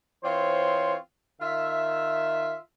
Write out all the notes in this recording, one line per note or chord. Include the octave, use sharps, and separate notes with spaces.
E3 C4 F4 C5 C#5
D#3 F4 E5